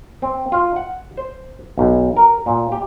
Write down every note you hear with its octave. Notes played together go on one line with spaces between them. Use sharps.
C4
F4
F#5
C5
B1
A#4
A#2
G4